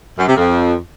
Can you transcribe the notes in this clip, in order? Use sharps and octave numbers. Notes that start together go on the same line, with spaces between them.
F#2
C3
F2